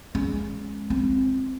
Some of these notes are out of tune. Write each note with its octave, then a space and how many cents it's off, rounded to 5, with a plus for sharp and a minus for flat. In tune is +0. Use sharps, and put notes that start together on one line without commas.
G#3 +0 C#4 -15
C4 +0 F4 +0